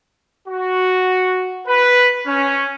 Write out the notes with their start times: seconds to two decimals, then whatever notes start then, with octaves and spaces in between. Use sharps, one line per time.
0.47 F#4
1.67 B4
2.27 C#4